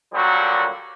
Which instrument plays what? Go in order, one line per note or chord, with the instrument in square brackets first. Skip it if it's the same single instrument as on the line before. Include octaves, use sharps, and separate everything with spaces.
[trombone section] A#2 D3 F#3 G3 A#3 F#4